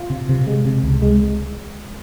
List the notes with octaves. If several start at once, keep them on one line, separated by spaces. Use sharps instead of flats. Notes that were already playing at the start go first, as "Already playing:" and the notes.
Already playing: F4
C3
C3
G#3
C3
C#2
G#3